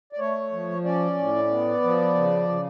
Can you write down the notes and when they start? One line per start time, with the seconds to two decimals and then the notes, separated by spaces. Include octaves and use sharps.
0.13 D5
0.19 A3 C#5
0.52 F3
0.85 C#4 D5
1.18 A2
1.50 B3
1.83 F3
2.15 C#3
2.49 C#3